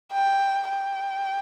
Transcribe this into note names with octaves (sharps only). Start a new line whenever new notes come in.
G5
G5